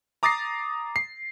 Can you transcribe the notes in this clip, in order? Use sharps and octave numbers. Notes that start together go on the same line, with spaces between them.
A#5 D6 D#6 A6 A#6 C7
C7